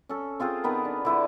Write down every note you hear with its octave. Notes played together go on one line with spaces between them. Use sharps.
C#4 A4
C4 F4 G#4 C5
D#3 B3 B4 G#5
D4
D3 E4 B4